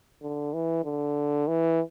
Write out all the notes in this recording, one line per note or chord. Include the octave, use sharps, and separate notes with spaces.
D3
E3
D3
E3